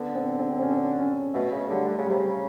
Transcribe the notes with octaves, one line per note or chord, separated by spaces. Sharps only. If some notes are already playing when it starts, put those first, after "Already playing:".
Already playing: D3 B3
C4
C4
C4
C#4
C#4
B2 A3
C#3
D3 G3
D3
C#3
C3 G3
C#3